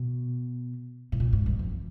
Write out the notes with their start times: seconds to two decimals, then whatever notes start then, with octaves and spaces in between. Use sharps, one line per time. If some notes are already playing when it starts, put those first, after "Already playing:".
Already playing: B2
1.12 A2
1.20 A#2
1.33 G#2
1.46 G2
1.59 F2